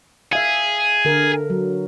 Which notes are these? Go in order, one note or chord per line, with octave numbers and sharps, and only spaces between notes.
G#4 E5 F5
D3 A#4
F#3